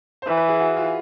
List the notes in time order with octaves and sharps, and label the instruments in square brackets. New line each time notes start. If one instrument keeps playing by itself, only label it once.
[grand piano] C5
[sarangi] E3 [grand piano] B4
[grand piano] B4
G#4
F#4
F4